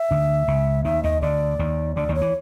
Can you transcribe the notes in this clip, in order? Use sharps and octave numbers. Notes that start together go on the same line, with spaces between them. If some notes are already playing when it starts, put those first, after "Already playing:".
Already playing: E5
D2 D3
C#2 C#3
D#2 D#3 E5
D#2 D#3 D#5
D2 D3 D5
D#2 D#3
D2 D3 D5
D#2 D#3
C#5
E3